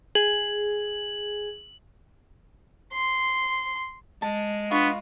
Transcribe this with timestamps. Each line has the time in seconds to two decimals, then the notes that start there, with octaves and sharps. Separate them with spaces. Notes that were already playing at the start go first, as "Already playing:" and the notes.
0.15 G#4 F#7
2.93 C6
4.22 G#3 A5
4.71 B3 D4 F4 B4 C#6